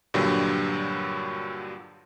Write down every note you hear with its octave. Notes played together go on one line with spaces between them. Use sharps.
G2 A#2 D3 F#3 G3